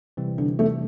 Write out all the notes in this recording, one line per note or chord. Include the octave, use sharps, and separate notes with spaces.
C3 E3 G3 C4
D3
A3